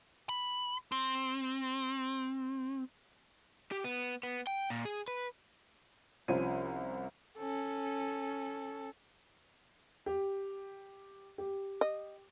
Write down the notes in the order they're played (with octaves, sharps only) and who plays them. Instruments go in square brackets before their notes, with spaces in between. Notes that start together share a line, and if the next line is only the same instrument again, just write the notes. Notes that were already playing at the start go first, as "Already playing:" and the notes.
[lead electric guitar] B5
C4
[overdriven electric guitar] G4
B3
B3
G5
A#2
G#4
B4
[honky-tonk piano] C2 F3 C#4 C5 G#6 D#7
[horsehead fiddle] C#4 A4
[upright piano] G4
G4
[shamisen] D#5